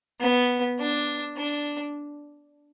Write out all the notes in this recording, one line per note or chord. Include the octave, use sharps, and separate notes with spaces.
B3
D4
D4